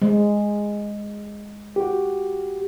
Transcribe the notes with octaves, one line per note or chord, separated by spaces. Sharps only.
G#3
F#4 G4